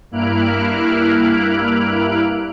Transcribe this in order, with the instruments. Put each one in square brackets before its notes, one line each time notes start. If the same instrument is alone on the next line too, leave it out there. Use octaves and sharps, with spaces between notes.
[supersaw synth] G2 A#3 E4 F6 F#6 D7